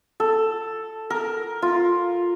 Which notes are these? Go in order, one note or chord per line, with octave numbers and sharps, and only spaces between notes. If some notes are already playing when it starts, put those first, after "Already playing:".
A4
A#4
F4